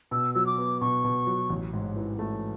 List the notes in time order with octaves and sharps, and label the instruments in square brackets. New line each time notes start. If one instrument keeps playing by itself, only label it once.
[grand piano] B2 [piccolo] E6
[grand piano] F#3 [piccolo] E6
[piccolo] D6
[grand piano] B3
[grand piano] B2 [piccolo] C#6
[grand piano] B2
F#3
A1
G#2
E3
A3